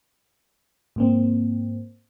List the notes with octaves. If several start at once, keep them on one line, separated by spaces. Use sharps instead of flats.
G#2 A#3 C4